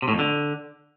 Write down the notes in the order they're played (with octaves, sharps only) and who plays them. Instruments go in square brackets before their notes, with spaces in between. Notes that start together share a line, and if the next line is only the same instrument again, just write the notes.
[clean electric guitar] C3
A2
F2
D3